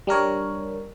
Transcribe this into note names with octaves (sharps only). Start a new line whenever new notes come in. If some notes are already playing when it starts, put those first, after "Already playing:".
G3 D4 A#4 C#5